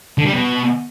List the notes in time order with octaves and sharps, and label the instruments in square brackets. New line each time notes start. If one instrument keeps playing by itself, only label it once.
[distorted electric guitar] D3
G3
B2